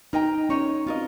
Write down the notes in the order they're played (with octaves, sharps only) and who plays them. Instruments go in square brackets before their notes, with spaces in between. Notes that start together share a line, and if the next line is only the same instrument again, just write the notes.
[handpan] D#4 [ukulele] A#4 D#5 G5 A#5
[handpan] C#4 [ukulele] D#4 A#4 C#5
[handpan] C4 [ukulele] F4 A#4 D#5